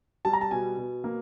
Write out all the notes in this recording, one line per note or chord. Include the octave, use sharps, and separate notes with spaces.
G3 A5
A#5
A5
B2 G#5
B2
A#3